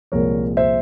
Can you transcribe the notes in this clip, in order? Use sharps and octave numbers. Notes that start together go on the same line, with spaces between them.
C2 A#2 F3 G#3 A#4 C#5
C5 E5